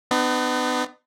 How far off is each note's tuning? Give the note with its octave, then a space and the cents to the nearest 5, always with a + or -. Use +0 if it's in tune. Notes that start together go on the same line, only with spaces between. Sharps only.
B3 +30 D#4 -45